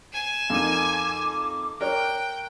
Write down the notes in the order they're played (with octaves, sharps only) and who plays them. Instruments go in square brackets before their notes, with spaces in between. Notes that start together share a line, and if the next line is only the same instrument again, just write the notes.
[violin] G#5 E7
[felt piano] F2 D#4 A#4 [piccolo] D6
[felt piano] A#4 C#5 [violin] G5 [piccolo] F#6